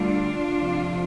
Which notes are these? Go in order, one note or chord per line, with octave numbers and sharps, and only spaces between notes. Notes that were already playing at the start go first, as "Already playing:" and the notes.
Already playing: D2 D3 G3 D4 F4
F2 C3 F3